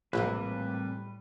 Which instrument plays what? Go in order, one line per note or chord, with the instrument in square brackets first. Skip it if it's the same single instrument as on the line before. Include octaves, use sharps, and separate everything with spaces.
[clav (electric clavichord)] A#1 [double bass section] A2 G3 [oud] C3 E3 A#3 [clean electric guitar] B4